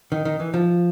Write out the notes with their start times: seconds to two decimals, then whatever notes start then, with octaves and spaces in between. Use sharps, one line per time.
0.12 D#3
0.25 D#3
0.40 E3
0.54 F3